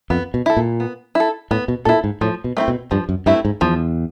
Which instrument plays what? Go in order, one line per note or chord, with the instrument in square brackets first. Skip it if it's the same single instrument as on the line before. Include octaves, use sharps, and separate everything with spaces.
[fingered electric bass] F2 [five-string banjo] B3
[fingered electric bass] B2
[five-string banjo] E4 A4
[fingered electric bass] A#2
[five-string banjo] B3
E4 A4
[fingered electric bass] A2 [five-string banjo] B3
[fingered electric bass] B2
[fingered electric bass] A#2 [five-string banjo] E4 A4
[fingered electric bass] G#2
[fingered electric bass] A2 [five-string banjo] F3
[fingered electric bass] B2
[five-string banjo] A3 C4 E4
[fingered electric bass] B2
[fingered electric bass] G2 [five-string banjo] F3
[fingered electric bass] F#2
[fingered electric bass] G2 [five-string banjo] A3 C4 E4
[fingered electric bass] G#2
[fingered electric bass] E2 [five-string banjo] F3